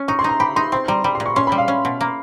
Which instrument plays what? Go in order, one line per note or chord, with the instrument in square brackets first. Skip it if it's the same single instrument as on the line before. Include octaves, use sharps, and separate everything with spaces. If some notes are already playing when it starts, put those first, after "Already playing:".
Already playing: [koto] C#4
[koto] D#4 [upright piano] C#6
[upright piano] C6
[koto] D#4 [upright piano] A#5
[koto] G4 [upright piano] B5
[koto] D#4 [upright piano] C6
[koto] C4 [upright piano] C6
[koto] G3 [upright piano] A#5
[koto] G3 [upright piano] B5
[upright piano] C6
[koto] A#2
[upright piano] C#6
[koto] C#4 [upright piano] C6
[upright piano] B5
[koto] G3
[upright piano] F5
[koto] C#4
B2
A#3